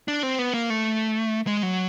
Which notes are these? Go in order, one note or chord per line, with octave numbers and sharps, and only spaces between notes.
D4
C4
B3
A#3
A3
G#3
F#3